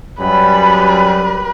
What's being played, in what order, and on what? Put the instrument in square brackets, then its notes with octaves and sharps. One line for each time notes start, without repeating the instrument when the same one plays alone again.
[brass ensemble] F#2 G3 [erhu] B4